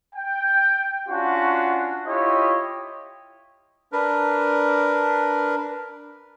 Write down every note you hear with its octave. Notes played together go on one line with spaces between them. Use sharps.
G5
C#4 D4 F4 F#4 F#5
E4 F4 G4 C#5 D#5
D4 A#4 B4